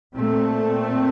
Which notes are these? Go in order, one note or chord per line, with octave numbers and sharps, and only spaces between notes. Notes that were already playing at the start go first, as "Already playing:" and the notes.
A#2 A3 C4